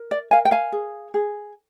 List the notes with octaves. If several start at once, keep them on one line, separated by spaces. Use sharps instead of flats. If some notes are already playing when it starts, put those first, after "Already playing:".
Already playing: A#4
D5
A#4 F5 G#5
G5
F5 G#5
G#4
G#4